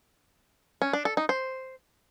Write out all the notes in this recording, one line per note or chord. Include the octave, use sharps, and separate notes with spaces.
C#4
D4
A4
D#4
C5